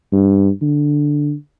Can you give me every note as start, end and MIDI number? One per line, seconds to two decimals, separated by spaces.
0.12 0.49 43
0.62 1.34 50